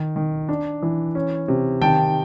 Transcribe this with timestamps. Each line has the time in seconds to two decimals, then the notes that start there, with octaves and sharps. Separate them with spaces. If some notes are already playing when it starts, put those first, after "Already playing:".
Already playing: D#3
0.16 D#3
0.49 D4
0.82 E3
1.15 C#4
1.48 C3
1.82 D#3 G5 A5